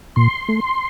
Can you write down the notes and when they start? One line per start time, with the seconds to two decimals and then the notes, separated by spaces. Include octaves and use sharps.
0.16 A#2 C6
0.48 A3